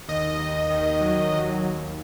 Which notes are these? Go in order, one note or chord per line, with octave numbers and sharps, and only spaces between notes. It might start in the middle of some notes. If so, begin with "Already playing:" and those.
D#2 D#5
D#2
D#3
F#3
D#2
D#2